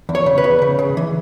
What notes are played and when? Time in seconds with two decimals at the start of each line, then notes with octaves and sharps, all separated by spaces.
0.09 E2
0.15 C#5
0.26 C#3
0.38 B4
0.44 E2
0.62 C#3
0.79 C#3
0.97 E3